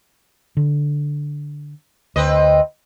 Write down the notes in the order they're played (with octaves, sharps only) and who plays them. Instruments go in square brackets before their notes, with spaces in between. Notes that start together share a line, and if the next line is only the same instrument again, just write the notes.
[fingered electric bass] D3
[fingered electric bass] D2 [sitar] C4 B4 D#5